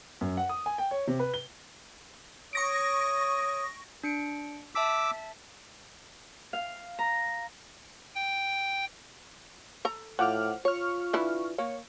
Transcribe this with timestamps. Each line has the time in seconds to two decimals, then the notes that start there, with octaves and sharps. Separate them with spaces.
0.21 F#2
0.37 F#5
0.49 D#6
0.66 G#5
0.78 G5
0.91 C#5
1.08 C3
1.19 B4
1.34 G7
2.53 C#5 C#6 D#6 A#6 D7
4.03 D4 C#7 D7
4.75 E5 A5 D6 E6 B6
6.53 F5
6.99 A#5
8.15 G5
9.85 A4 A#5
10.19 A2 F3 F#5 D6 F6
10.65 F4 C#5 C#6 F6
11.13 D3 E3 E4
11.58 A#3 C#5